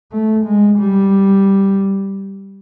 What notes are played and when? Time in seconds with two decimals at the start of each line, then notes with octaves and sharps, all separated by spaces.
0.12 A3
0.46 G#3
0.79 G3